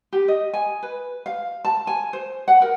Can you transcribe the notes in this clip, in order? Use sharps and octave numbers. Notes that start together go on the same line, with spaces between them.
G4
D#5
G#5
B4
F5
A5
G#5
C5
F#5
A#4